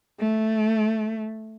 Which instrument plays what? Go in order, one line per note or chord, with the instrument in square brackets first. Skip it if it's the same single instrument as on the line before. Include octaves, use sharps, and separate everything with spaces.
[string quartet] A3